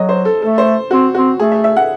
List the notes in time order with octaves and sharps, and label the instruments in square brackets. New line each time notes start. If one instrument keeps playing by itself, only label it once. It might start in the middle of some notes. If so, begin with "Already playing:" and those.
Already playing: [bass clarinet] F#3 [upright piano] D#5
[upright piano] C5
A4
[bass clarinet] A3 [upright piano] A4
[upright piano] C5
[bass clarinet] C4 [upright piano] F#4
[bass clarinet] C4 [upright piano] F#4
[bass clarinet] A3 [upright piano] G#4
[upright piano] E5
E5
F#5